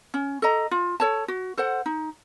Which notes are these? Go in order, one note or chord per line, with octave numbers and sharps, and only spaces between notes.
C#4
A4 D#5 A#5
F4
A4 C#5 A5
F#4
A4 C5 F#5
D#4